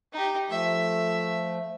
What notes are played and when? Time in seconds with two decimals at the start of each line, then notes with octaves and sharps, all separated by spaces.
0.13 D#4 G4
0.50 F3 A3 E5